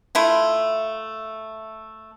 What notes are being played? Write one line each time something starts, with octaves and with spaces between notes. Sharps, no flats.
A3 E4 F4